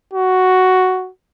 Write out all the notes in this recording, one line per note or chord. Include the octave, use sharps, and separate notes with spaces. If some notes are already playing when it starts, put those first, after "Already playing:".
F#4